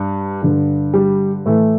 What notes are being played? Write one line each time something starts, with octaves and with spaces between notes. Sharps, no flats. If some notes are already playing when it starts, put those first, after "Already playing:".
Already playing: G2
G2 D3
G3
A2 E3 A3